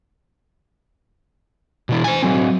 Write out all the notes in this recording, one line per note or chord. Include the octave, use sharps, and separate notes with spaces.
B2 E3 E4
C5 G#5
F#3 C4